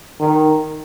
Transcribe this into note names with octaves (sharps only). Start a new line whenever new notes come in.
D#3